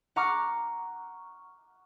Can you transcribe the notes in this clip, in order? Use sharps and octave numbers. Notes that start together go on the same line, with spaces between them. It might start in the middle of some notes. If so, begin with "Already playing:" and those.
F#5 A#5 C#6 D6 F6